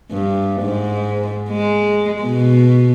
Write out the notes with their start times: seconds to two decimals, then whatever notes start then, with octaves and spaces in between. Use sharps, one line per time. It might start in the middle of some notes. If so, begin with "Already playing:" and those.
0.11 G2
0.61 G#2
1.50 G#3
2.22 B2